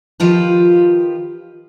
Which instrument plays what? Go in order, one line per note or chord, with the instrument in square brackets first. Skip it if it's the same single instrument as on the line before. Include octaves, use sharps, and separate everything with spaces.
[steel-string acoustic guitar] D#3 F3 F4 G4 B4